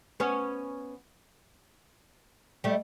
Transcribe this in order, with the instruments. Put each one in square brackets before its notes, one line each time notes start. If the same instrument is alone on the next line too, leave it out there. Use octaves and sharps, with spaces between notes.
[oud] B3 C#4
G3 A3